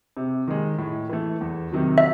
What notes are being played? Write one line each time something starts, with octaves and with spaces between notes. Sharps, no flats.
C3
D#3 G#3
A2
E3 A3
E2
C3 D#3 F#3
E5